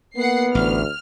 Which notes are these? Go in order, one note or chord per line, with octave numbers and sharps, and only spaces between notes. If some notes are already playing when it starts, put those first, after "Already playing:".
A#3 B3 F#5 C7
A1 D2 F6